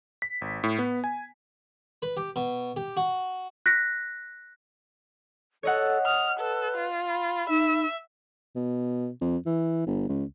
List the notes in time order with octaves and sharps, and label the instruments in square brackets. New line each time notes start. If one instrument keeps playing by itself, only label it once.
[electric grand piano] B6
G#1
A2
B3
G#5
[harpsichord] B4
G4
B2
G4
F#4
[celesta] F#6 A#6 B6
[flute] A4 [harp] C#5 D#5 F#5
[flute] D#6 [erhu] F6
[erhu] A4 [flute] B4
[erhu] F4
[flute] B5
[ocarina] D#4 [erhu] E5
[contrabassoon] B2
F2
E3
G1
C#2